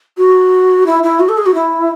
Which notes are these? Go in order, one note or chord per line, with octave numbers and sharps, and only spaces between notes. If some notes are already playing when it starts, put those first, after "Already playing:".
F#4
E4
E4
F#4
A4
G#4
F#4
E4